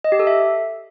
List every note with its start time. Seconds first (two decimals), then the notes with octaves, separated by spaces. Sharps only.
0.04 D#5
0.12 G4
0.19 A4
0.27 E5